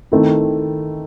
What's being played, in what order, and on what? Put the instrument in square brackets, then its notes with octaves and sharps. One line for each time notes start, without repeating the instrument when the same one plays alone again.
[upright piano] D#3 A3 C4 E4